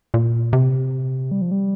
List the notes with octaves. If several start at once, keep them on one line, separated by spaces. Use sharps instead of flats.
A#2
C3
G3
F3
G3